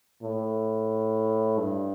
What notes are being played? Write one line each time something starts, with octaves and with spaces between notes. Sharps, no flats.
A2
G2